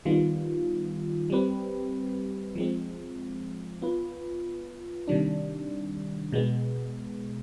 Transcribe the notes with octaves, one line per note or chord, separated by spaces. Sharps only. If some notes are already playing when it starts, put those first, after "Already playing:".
D#3 G3 B3 F4
G3 C4 G4 B4
F3 G#3 C4
B3 F4 B4
C3 D#3 G3 D4
B2 G#3 B3